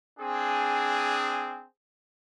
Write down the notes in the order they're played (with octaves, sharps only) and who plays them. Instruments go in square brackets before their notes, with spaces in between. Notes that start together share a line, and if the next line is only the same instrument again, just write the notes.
[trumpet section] C4 D4 G#4